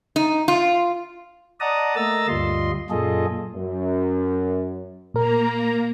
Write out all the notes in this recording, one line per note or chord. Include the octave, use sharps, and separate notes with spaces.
D#4
F4
D5 D#5 F#5 A5 A#5 D#6
A3 A#3 D#5 A#5 E6 A6
D2 G2 G3 F4 D#5 C6
F#2 A#2 F4 G#4 A4 D#5
F#2
A#2 A#3 A#4 A#5